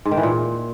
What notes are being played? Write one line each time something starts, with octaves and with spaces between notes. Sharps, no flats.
G#2
D#3
E3
A#2